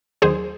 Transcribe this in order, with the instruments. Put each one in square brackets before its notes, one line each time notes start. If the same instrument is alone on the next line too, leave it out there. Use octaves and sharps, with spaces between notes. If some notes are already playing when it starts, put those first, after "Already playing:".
[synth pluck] D#2 D#3 F#3 G#4 C5